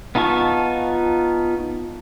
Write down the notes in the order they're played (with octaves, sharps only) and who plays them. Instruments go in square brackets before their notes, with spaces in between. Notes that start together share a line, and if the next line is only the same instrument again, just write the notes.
[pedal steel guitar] B3 D#4 F4 A5 C#6